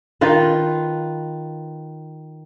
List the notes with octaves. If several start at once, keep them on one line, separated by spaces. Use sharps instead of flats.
D#3 F4 B4